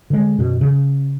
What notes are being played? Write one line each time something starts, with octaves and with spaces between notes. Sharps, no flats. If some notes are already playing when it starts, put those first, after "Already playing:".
D3 G#3
F#2 B2
C#3